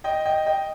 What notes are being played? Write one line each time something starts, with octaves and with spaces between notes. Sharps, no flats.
D#5 G5
D#5 G5
D#5 G5